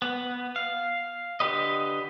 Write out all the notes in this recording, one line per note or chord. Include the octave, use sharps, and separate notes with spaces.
B3
F5
D3 G4 B4 D#5